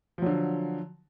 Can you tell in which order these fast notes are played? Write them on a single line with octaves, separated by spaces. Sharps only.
F3 F#3 D3